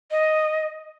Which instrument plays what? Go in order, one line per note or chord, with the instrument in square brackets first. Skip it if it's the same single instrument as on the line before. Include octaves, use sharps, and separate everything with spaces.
[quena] D#5